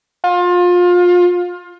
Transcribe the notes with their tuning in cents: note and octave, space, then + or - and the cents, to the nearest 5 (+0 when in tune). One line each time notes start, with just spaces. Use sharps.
F4 +25